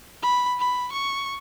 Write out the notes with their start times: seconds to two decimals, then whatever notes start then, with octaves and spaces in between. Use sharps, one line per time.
0.23 B5
0.60 B5
0.93 C#6